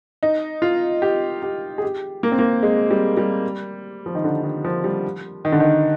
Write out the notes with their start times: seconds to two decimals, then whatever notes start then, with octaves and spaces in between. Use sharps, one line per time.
0.23 D#4
0.62 F4
1.02 G4
1.42 G4
1.78 G#4
1.82 G4
2.23 A#3
2.32 C4
2.39 A#3
2.63 G#3
2.91 G3
3.17 G3
4.06 F3
4.15 D#3
4.24 D3
4.44 D#3
4.65 F3
4.84 G3
5.45 D#3
5.52 D3
5.60 D#3